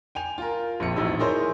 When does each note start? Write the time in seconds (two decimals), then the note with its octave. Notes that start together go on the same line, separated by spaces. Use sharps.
0.15 G5 G#5 F7
0.38 F4 A#4
0.80 A#1 F2 C#7
0.96 E1 A#1 A2 D#4 E6
1.19 D#4 E4 G#4 A#4 C5 C#5